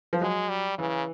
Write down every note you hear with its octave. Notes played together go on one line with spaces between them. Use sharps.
F3
F#3 G#3
G3
C#3 E3